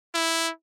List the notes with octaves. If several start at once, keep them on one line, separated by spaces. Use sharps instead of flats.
E4